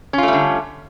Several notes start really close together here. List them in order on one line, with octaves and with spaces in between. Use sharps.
C#4 F4 A3 G3 D3